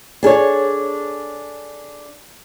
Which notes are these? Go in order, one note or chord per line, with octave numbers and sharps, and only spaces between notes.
D4 G#4 A4 C#5